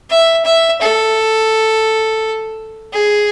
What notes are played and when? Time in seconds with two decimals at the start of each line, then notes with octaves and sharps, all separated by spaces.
0.10 E5
0.45 E5
0.82 A4
2.93 G#4